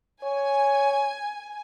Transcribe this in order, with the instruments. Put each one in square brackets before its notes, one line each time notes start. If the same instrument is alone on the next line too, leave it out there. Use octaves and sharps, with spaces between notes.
[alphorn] C#5 [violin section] G#5